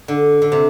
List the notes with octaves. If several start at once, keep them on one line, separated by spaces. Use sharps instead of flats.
D3
D3
C3